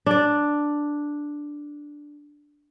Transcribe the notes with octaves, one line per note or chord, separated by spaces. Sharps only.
D4 D5